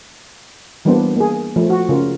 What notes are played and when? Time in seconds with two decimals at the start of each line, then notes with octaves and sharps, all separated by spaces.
0.85 E3 G3 A#3 B3 D4 C5
1.16 A#3 G#4
1.56 F3 A3
1.70 F#4
1.89 C#3 F4 A#4